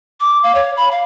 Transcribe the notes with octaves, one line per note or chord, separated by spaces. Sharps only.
D6
F5
C#5
B5
F5